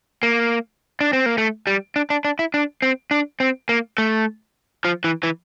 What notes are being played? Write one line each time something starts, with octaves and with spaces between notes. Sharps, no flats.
A#3
D4
C4
A#3
A3
G3
D4
D4
D4
E4
D4
C4
D4
C4
A#3
A3
F3
E3
E3